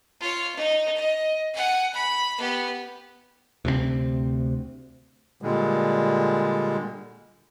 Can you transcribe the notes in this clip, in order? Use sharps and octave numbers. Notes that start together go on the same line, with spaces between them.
F4 C#5
D#4
D#5
F#5 G#5
B5
B3 G4
D2 C3 G#3 C4
A#2 D3 G3 G#3